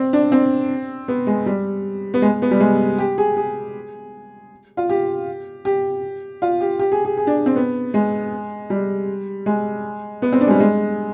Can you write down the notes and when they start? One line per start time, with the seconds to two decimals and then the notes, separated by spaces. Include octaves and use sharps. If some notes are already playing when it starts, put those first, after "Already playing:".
Already playing: C4
0.13 D4
0.32 C4
1.08 B3
1.27 G#3
1.46 G3
2.14 B3
2.22 G#3
2.42 B3
2.51 G3
2.60 G#3
2.99 G4
3.18 G#4
3.37 G#4
4.77 F4
4.90 G4
5.65 G4
6.42 F4
6.61 G4
6.79 G4
6.92 G#4
7.05 G#4
7.17 G#4
7.27 D4
7.46 C4
7.56 B3
7.94 G#3
8.70 G3
9.46 G#3
10.22 B3
10.32 C4
10.41 D4
10.47 G#3
10.51 G3
10.60 G#3